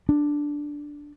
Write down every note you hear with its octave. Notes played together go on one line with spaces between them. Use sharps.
D4